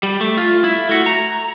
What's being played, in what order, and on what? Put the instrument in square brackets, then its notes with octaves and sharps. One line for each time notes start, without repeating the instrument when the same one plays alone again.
[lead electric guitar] G3
A3
F4
E4
A3 F#4
A#5